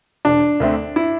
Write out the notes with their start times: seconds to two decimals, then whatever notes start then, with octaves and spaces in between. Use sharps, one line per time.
0.25 E1 D4
0.60 D2 D3 A3 C4
0.96 E4